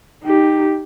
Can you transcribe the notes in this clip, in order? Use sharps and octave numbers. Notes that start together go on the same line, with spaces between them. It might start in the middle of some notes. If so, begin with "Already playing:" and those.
D#4 G4